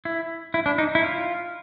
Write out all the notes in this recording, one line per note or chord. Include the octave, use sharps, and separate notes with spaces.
E4
E4
D4
D#4
E4
F4